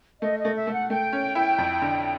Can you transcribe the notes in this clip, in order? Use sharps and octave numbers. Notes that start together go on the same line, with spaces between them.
A3 D#5
D#5
A3
E5
A3
F#5
A3 G5
C#4
E4
F2
D3